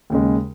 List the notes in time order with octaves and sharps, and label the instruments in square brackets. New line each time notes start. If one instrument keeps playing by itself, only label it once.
[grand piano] D#2 C#3 G#3